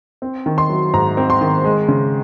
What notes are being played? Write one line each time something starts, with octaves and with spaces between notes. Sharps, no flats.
C4
D#3
C6
F#3
G#2 A#5
C4
C6
D#3
G#3
C#3